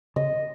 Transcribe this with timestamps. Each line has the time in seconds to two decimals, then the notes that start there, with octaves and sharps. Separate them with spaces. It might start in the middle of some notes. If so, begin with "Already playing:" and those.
0.16 C#3 D#5